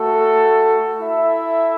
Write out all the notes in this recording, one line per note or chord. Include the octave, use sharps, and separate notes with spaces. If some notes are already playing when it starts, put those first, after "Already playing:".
Already playing: A3 F#4 A4
E4 A4 E5